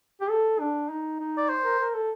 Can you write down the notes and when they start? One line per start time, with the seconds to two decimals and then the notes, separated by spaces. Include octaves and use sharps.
0.21 G4
0.29 A4
0.60 D4
0.89 D#4
1.20 D#4
1.37 D5
1.49 C5
1.64 A#4
1.80 A#4
1.95 A4